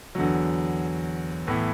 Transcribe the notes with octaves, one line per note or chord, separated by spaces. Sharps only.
E2 D3 F#3
A2 E3 B3